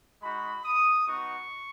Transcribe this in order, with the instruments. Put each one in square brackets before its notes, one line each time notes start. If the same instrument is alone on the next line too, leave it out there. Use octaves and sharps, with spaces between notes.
[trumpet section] G#3 D#4 F#4 B5
D#6
B3 D#4 F#4 C#6